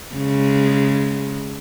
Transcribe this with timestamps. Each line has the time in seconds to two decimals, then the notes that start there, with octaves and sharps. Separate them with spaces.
0.15 C#3 G#3